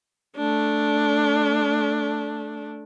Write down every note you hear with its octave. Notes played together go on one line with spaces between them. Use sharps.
A3 D4